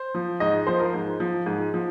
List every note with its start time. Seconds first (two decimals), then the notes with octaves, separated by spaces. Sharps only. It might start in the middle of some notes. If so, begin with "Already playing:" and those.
Already playing: C5
0.15 F3
0.40 G#2 D#5
0.67 F3 C5
0.80 A#4
0.94 G#2
1.20 F3
1.46 G#2
1.74 F3